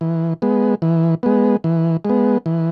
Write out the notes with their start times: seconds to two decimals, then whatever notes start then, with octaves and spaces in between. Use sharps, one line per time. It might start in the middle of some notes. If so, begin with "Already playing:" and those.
0.01 E3
0.42 G#3 B3
0.82 E3
1.23 G#3 B3
1.64 E3
2.05 G#3
2.10 B3
2.46 E3